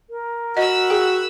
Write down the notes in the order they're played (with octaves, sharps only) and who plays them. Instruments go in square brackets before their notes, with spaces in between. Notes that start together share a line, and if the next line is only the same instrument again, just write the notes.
[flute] A#4
[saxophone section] F#4 [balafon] D#5 [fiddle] B5 E6
[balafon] G#4 G5